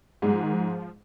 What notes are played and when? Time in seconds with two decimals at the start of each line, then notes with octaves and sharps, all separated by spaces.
0.22 G#2 G3 G#3
0.33 F3
0.43 D#3
0.53 F3